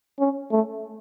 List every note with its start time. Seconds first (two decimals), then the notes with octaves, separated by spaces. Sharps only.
0.19 C#4
0.51 A3